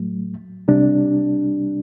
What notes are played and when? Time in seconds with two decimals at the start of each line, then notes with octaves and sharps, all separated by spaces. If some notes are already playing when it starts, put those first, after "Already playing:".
Already playing: A2 F#3 A3
0.68 C2 C3 G3 D4